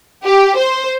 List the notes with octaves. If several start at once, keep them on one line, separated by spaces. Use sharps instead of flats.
G4
C5